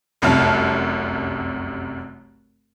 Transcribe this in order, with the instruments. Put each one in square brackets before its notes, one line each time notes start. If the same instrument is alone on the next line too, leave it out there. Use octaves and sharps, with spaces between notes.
[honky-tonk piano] F1 C2 F#2 C3 A5 F6